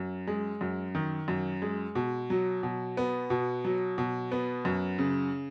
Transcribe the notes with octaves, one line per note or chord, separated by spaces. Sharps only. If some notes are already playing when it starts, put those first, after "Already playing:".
Already playing: F#2
G#3
F#2
D#3
F#2
G#3
B2
F#3
B2
B3
B2
F#3
B2
B3
F#2
C#3